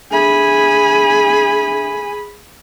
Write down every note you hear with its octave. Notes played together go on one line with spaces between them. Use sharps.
D4 G#4 A4 E5 G#5 B5